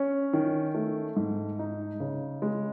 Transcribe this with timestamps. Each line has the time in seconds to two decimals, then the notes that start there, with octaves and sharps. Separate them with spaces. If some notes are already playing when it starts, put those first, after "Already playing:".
Already playing: C#4
0.33 D#3
0.75 A3
1.16 G#2
1.59 D#4
2.00 C#3
2.42 G#3